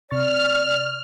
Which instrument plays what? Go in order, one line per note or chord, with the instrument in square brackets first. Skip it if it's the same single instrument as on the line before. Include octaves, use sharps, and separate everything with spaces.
[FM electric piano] C3 C#6 A6 [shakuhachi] D5 [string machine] F6